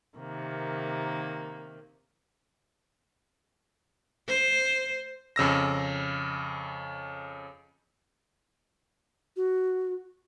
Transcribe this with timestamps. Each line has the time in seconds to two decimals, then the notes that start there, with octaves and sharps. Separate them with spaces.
0.18 C3 D#3 A#3
4.28 C5
5.36 F2 C#3 E6 A#6
9.36 F#4